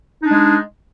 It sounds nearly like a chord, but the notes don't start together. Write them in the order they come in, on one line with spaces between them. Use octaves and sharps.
D#4 D4 G#3